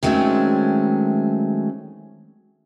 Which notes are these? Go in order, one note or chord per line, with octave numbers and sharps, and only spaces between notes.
D#3 F#3 G#3 A3 C4 C#4